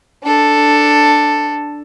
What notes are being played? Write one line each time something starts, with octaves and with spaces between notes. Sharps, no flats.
D4 A4